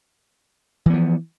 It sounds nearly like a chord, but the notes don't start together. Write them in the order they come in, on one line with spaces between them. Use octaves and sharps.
E3 B3 F3